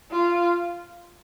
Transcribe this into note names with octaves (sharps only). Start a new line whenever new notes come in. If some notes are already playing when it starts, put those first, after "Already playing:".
F4